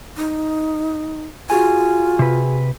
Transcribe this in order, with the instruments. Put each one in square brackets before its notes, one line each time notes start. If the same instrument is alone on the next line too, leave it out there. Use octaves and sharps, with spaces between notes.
[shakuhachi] D#4
[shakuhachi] F4 [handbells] F#4 G#4 G#5
[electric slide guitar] C3 B4